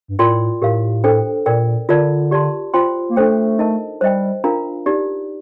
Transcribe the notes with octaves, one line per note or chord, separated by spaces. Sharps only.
G2
A2 F4 A#4 D5 G5 C6
A2 G4 A#4 F5
D4 A4 C5 G5
A#2 A#4 D5 G5
D3 F4 A#4 D5 A5
G4 D5 A5 C6
F4 C5 G5 C6
A#3
A3 D4 A4 C5 G5
D#4 A#4 D#5 A5
G3 C5 D#5 G5
D4 F4 A#4 F5 A#5
D#4 G4 D5